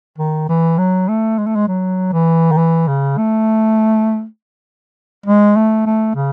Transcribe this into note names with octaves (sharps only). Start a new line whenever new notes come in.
D#3
E3
F#3
A3
G#3
A3
G#3
F#3
E3
D#3
E3
C#3
A3
G#3
A3
A3
C#3